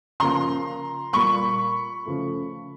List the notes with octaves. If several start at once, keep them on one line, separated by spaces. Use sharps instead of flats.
C#3 F3 A#3 A#5 C6
A#2 G3 A#3 B5 C#6
C#3 F3 A3